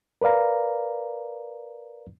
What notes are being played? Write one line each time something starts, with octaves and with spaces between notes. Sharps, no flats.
A#4 B4 D5 F5 A#5